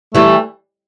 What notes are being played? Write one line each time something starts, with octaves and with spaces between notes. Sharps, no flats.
E3 G3 A3